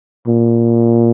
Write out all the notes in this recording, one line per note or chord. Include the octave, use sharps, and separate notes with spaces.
A#2